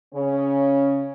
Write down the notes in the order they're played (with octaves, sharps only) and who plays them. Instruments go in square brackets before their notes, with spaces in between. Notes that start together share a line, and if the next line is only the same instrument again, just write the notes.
[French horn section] C#3 C#4